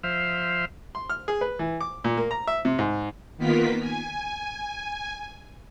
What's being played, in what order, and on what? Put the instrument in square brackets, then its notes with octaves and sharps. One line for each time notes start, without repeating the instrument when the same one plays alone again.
[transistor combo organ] F3 C5 E5 F5
[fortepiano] C6
F6
G#4
B4
E3
D6
A#2
A#3
A#5
E5
C3
G#2
[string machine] D#3 A#3 B3 F4 A#4 B6
G#5